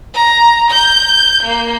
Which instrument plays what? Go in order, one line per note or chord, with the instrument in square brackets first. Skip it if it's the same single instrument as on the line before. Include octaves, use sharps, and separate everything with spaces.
[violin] A#5
G6
A#3